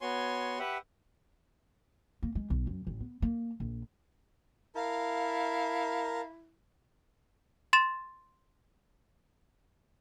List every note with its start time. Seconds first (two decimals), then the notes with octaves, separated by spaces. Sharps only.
0.01 B3 F#4 C#5 G#5 C6
0.59 G4 B4 E5 F#5
2.23 A#3
2.35 G#3
2.50 B1
2.67 F#2
2.87 A1
3.00 B3
3.22 A#3
3.60 A#1
4.76 E4 A#4 F5 A5
7.73 C6 A6 E7